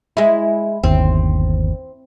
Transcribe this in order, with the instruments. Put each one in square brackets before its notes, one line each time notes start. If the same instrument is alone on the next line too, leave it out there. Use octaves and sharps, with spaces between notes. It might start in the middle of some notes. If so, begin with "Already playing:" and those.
[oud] G#3 E4
[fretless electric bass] G1 D#2 [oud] C4